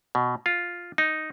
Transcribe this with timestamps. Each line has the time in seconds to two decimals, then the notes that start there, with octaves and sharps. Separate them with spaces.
0.15 B2
0.46 F4
0.98 D#4